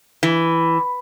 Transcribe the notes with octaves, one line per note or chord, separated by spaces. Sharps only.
E3